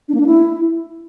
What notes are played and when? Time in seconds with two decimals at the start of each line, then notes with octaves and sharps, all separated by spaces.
0.09 D4
0.14 A#3
0.20 D4
0.26 E4